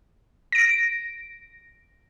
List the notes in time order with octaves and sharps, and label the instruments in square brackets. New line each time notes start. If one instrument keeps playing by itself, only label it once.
[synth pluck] A#6 D7